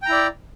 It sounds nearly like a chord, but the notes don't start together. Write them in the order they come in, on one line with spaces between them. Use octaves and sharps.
G5 A#5 E4 D5